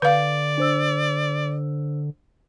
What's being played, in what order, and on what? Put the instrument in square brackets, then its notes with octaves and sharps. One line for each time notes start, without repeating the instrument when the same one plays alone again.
[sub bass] D3 [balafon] B4 F5 [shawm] D5
[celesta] D4 C5 E6